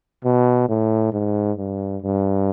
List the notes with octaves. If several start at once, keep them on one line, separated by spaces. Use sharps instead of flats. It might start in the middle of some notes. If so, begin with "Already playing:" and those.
B2
A2
G#2
G2
G2